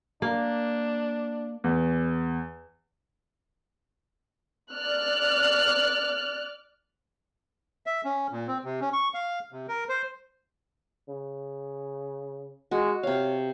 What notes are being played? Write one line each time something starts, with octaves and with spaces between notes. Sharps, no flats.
A#3 D4
E2
D5 F6 F#6
E5
C#4
A#2
C4
C3
C#4
C#6
F5
C3
A#4
C5
C#3
G#3 F#4
C3 C#5 F5